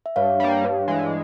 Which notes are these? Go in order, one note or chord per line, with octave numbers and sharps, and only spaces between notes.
E5
G2 C#5 F5
G3 A#3
G2
E3 G#3